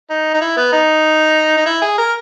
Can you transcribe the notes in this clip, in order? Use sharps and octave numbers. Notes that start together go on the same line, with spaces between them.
D#4
D#4
E4
B3
D#4
D#4
E4
G#4
A#4